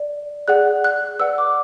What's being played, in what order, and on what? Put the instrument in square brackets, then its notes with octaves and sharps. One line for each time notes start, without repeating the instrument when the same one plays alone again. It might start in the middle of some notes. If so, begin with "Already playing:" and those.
Already playing: [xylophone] D5
G#4 D5 F#5 F#6
F#6
B4 D5 F#5 E6
D6